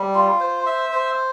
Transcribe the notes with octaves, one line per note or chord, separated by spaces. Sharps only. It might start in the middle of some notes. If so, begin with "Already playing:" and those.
Already playing: G3
F4
C5
E5
C5